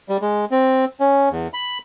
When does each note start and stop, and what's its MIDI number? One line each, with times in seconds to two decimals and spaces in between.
0.09 0.17 55
0.21 0.45 56
0.51 0.85 60
1.00 1.29 61
1.31 1.47 40
1.54 1.78 83